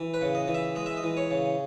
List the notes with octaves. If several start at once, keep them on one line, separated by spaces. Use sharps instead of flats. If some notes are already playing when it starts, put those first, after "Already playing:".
Already playing: E3
B4
C#3
D#5
E3
E5
G#3 D#5
E5
D#5
E3
C#5
C#3